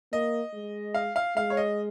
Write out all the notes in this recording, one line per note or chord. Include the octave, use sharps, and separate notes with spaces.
A#3 D#5
G#3
F5
F5
G#3 F5
C#5
D#5